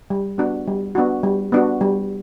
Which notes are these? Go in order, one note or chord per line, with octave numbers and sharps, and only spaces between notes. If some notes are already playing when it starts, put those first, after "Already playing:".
G3
B3 D4 F#4
G3
B3 D4 F#4
G3
B3 D4 F#4
G3